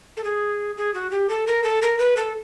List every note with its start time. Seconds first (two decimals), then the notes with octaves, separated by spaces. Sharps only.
0.17 A4
0.24 G#4
0.77 G#4
0.94 F#4
1.11 G4
1.29 A4
1.47 A#4
1.64 A4
1.82 A#4
1.99 B4
2.17 A4